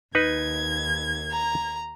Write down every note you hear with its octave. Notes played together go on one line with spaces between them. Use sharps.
D#2 D#4 B4 G#6
A#5